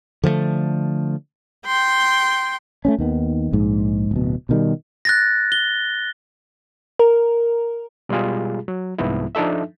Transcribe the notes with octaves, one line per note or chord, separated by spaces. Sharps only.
D3 F3 G3 A3
G5 C6
A3 C4 C#4
D#2 D#3 B3
A#1 G#2
D1 B2
B2 D#3 G3
F#6 A6 A#6
G7
A#4
B2 G3 G#3 F4 G#4
F#3
C2 G#2 F3 B3 E4
F3 D4 D#4 A4 E5